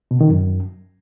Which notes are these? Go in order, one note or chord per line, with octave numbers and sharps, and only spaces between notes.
B2
D#3
F#2